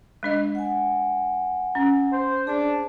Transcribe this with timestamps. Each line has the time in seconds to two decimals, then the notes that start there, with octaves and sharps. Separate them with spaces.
0.23 G#3 D4 D#5
0.55 F#5 G#5
1.75 C#4
2.12 C5
2.47 D4 G#4 C5